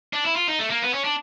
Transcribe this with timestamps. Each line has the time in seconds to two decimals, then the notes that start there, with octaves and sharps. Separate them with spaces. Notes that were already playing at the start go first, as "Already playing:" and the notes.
0.13 D4
0.25 E4
0.36 F4
0.48 D#4
0.59 A3
0.70 A#3
0.82 B3
0.93 C#4
1.04 D4